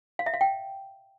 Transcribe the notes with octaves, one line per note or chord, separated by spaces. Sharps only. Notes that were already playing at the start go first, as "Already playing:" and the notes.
F5
E5
F5
G5